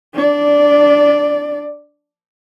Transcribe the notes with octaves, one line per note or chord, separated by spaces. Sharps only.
D4 D5